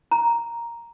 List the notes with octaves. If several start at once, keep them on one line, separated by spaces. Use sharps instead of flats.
A#5